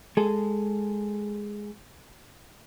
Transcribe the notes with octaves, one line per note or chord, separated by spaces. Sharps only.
G#3 G#4 A4